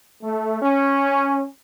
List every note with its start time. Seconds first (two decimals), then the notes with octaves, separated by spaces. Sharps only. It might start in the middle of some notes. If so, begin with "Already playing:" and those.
0.22 A3
0.62 C#4